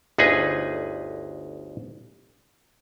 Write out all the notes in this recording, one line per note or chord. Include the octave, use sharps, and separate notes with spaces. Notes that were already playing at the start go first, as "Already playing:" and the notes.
G1 D2 D#4 G#4 B4 G#5